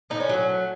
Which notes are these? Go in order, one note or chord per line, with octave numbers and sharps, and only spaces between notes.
A2 D#4
C#4
F#3
A3